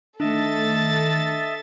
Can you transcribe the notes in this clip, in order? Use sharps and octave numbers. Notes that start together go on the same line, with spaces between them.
D#3 A3 D4 A4 D#5 E5 A5 A6